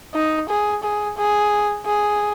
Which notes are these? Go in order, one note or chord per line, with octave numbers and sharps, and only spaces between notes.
D#4
G#4
G#4
G#4
G#4